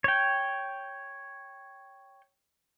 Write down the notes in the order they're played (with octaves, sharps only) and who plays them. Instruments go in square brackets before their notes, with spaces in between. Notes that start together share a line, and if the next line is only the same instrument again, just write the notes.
[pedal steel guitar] C#5 G5